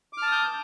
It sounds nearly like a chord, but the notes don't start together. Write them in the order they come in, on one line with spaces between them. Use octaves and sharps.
D6 F6 A5 D#6 G6